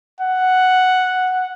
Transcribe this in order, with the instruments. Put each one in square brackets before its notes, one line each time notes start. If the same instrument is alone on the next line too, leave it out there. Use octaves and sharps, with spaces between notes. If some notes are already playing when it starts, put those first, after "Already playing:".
[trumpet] F#5